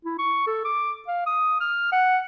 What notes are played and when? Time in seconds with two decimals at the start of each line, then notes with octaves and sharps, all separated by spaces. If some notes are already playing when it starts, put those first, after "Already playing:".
0.05 E4
0.19 C#6
0.47 A4
0.65 D6
1.08 F5
1.26 D#6
1.61 F6
1.92 F#5